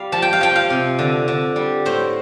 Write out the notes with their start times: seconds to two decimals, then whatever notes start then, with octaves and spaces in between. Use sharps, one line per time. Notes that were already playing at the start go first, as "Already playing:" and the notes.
Already playing: G3 F5
0.12 F3 A5
0.22 G5
0.33 F5
0.41 F3 G5
0.56 F5
0.70 C3
0.99 D3
1.28 D3
1.56 G3
1.85 A2 C5